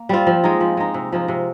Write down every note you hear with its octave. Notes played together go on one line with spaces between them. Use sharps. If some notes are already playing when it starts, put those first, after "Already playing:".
Already playing: A#3
G3 C4 F4
F3
G#3 D#4
F3
G#3 D#4
C3
F3 G#3 D#4
C3